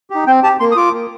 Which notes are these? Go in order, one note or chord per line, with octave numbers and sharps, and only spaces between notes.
D#4 G4
C4 G5
G4 A5
A#3 C6
D#6
F4 D6
A#3